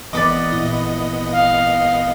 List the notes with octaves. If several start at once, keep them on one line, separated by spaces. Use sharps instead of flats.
G#1 E3 B3 D5 D#5 B5 D6
A#2 E4
F5